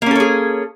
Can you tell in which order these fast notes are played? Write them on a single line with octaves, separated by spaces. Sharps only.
A#3 C#4 A4 C#5 G#4